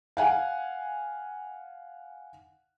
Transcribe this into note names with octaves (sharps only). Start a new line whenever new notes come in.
F5 F#5 G#5